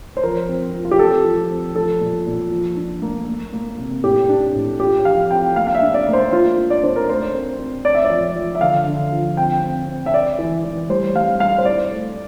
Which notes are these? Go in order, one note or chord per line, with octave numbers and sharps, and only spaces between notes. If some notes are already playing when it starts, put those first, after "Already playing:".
C5
F3 A#4
C4
F4
F4
G4
C4 A4
F3
C4
F3 A4
A#2
A#2
F3
D4
A#3
A#3
A#3
C3
A2 G4
D4
A2
F4 G4
F3 F5
C4 G5
A#3 F5
F5
E5
D4
D5
A#3
C5
D4 F4
D4
D5
D4 C5
A#4
A3 C5
C4
C4
C4 D5
E5
D5
F3
F3
E5
D3 F5
D3
F3
C4 G5
C4
C4
E5
C4 D5
E3
E3
G3 C5
G3 F5
G3 F5
C5
E4 D5
A3